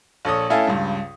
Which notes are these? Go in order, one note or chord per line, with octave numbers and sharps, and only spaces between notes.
A#1 A4 C#5 D#6
A3 C#4 E4 A4 F5 G#5
C#2 G2